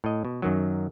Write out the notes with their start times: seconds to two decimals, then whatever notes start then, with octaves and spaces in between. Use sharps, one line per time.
0.04 A2 D#5
0.25 B2
0.42 F#2 D#3 F#3